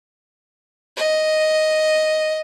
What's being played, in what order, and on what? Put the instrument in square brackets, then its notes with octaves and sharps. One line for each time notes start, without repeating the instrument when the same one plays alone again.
[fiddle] D#5